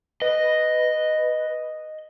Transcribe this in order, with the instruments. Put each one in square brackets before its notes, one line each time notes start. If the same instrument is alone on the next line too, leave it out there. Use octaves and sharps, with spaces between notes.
[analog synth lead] B4 [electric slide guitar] D#5